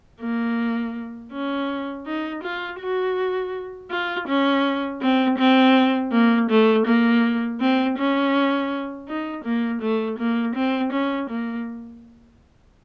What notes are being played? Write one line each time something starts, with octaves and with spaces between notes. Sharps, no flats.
A#3
C#4
D#4
F4
F#4
F4
C#4
C4
C4
A#3
A3
A#3
C4
C#4
D#4
A#3
A3
A#3
C4
C#4
A#3